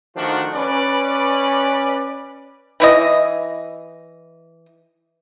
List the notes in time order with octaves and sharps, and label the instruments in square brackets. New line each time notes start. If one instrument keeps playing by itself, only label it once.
[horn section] D#3 F3 A3 D4 F4 F#4
C#4 B4 D5
[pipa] E3 E4 D#5